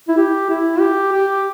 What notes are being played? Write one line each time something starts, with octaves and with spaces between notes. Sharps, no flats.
E4
G4
E4
G4
G4